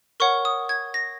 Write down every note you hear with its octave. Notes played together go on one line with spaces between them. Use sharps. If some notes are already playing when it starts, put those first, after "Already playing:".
A#4 C#5 F#5 C#6
D#6
G#6
A#6